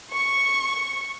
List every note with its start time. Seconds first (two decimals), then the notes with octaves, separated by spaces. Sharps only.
0.11 C#6